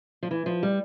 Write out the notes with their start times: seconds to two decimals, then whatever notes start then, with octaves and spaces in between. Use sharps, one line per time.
0.23 F3
0.31 E3
0.46 F3
0.63 G3